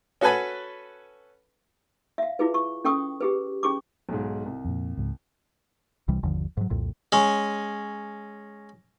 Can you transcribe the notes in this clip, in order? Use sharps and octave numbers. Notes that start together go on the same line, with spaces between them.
C#4 F#4 A4 B4 G#5 B5
E5 F5
E4 F4 G#4 B4
C#6
C#4 A4 G5 C#6 D#6
G4 G#4 B4
C#4 G#4 C#6 D6
B1 G#2
C2
F2 A#2
C#2 G#2
C2 C3 E3 G3
G1 D#2 D3 F3
G#2 F#3
C2 F2 A#2
G#3 C#4